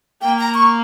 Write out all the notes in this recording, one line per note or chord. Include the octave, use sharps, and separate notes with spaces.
A#3 G5
A#5
C#6